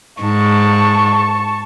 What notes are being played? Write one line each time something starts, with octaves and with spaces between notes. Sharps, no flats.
G#2 A5 C#6